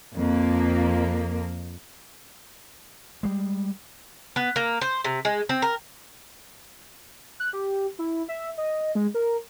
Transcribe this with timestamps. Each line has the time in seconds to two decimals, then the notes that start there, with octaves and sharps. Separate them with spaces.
0.13 F2 A#3
3.23 G3 G#3
4.36 B3
4.56 A#3
4.81 C5
5.05 C3
5.25 G#3
5.49 C4
5.62 A#4
7.40 F#6
7.53 G4
7.99 E4
8.28 E5
8.58 D#5
8.95 G#3
9.14 A#4